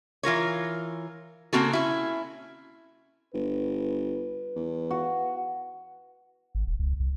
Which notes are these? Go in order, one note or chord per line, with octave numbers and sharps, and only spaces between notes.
E3 F4 A#4 C#5
C#3 G3 A#3 C4 F#4 A4
C#4 E4
G1 B4
E2
F#4
G#1
D#1
C#2
C2